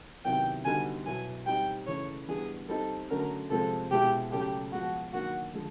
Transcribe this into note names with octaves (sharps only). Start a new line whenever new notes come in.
C3 D#3 F#3 B3 E4 G5
D3 G3 B3 D#4 F#4 G#5
B2 F#3 B3 E4 G#5
G3 C4 D#4 G4 G5
C#3 E3 A3 C#5
E3 G3 B3 D4 G#4
G3 C4 D#4 A4
D3 F#3 A3 C#4 F#4 A#4
C3 F3 G#3 C4 A4
B2 G#3 B3 E4 G4
C#3 F#3 A3 G4
F3 G#3 B3 F#4
D#3 F#3 A#3 D4 F#4
D3 F3 G#3